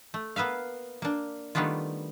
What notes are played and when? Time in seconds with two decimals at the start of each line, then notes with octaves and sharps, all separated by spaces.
0.14 A3
0.36 A#3 B3 B4 E5 F5
1.02 A#3 D4
1.55 D#3 G3 A3 B3 D4 F4